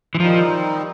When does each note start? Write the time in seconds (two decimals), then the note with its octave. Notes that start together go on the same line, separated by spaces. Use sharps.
0.15 E3
0.20 D#3 F3 G3 C4 D#4